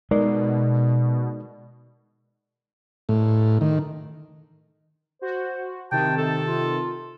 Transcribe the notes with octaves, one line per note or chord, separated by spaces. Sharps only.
B2 G#3 D#4 A#4 D5
A2
D#3
F#4 C5
C3 D#3 G5 A5
A4
F4